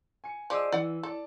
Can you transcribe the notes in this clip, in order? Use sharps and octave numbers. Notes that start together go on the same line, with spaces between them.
G#5 C#7
F3 G#4 D5 D#5 D6 E6
E3 E4 D5 F#5
A4 D5 A5